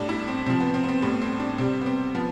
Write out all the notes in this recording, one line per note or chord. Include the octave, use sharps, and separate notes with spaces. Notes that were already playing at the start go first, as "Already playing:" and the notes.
Already playing: A2 G3 D4
E4
C4
C3 F3 C4
B3
C4
B3
C4
A2 G3 B3
C4
D4
C3 G3 C4
B3
C4
F3 B3